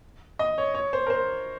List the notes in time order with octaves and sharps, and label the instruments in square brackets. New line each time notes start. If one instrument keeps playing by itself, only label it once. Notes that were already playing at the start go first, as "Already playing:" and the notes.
[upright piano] D#5
C#5
C#5
C5
A#4
C5